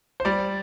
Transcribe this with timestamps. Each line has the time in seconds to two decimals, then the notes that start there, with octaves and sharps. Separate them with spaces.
0.20 C5
0.25 G3 D5